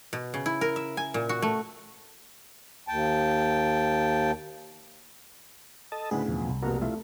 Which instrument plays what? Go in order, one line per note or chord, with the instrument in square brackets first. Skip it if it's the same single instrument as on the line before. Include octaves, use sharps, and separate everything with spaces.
[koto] B2
C#3
E4
A#4
E5
G#5
A#2
F#4
A3
[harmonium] D#2 G5 A5
[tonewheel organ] A4 D#5 A5
[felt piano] D2 A2 C#3 [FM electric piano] G#4 [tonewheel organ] B4
[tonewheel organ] E2 B2 F3
[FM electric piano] C2
[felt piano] F1 B2 [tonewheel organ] A#3 F#4 A#4
[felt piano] A3 [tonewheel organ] E4 F4